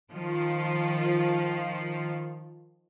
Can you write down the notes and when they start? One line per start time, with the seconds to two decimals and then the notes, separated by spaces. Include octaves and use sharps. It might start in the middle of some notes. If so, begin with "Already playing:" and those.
0.12 D#3 F3 F4